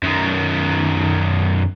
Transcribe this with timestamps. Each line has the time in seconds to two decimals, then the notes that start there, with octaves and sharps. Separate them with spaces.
0.03 F#2 D#3